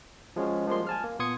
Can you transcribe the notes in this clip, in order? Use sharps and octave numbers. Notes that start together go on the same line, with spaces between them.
F3 G#3 C#4 F#4
F3 G3 G#3 A#3 C6
G#5 A5 F6
A#3
A#2 B3 C6 D#6 G#6 C#7